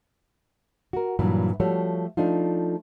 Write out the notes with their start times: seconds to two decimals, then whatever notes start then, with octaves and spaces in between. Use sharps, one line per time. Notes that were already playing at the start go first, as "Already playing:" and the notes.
0.93 F#4 A#4
1.19 G2 A#2 E3 F#3
1.60 F3 G3 A3 F#4 C#5
2.17 F3 A3 D4 D#4 F4